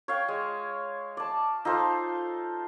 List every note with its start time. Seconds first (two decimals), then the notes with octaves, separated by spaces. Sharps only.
0.08 C#5 F5 G5
0.28 G#3
1.17 D5 A5
1.65 D#4 F4 A4 C5